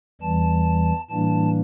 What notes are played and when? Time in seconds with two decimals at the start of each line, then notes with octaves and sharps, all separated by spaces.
0.21 E2 E3 G3 A5
1.09 A2 E3 G3 A#3 D4 A5